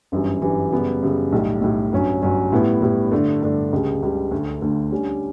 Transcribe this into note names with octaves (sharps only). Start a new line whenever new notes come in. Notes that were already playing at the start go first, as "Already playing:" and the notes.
G1 F#2 E3 G3
G1 F#2 E3 G3
F#2 C#3 G3 B3
F#2 C#3 G3 B3
B1 A2 G3
B1 A2 G3
G1 G2 F#3 C#4
G1 G2 F#3 C#4
A2 G3 B3 E4
A2 G3 B3 E4
G2 D3 A3 D4
G2 D3 A3 D4
C#2 C#3 G3
C#2 C#3 G3
D2 D3 A3
D2 D3 A3
D3 G3 C#4